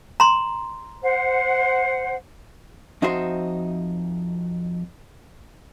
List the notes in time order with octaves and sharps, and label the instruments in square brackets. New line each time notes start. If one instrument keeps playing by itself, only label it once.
[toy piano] A#5 C6
[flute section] C5 F#5
[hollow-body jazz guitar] F2 D#4 F#4 C5 E5 C6